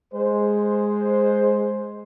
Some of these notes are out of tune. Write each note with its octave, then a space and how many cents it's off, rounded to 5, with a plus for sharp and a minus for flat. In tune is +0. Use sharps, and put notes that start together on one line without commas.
G#3 +0 C5 +0